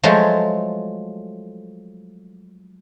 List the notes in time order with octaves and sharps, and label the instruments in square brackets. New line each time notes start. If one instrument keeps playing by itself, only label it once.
[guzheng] F3 F#3 G#3 A3